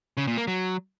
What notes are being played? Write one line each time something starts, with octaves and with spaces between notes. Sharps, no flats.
C#3
A#2
A#3
F#3